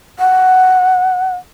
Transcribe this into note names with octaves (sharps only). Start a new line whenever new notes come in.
F#5